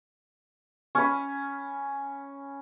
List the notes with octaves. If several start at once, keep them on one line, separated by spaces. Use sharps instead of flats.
C#4 B5